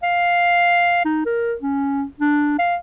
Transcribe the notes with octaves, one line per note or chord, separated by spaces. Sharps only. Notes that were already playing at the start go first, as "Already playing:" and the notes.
F5
D#4
A#4
C#4
D4
F5